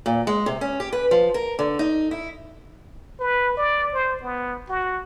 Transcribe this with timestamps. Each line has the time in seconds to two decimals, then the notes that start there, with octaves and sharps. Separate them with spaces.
0.06 A#2
0.27 G#3
0.46 C3
0.61 C#4
0.80 G4
0.93 B4
1.11 F3
1.34 A#4
1.59 D3
1.79 D#4
2.11 E4
3.20 B4
3.57 D5
3.94 C5
4.22 B3
4.69 F#4